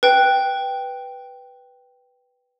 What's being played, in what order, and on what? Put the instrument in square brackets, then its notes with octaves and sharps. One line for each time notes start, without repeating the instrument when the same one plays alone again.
[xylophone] B4 G5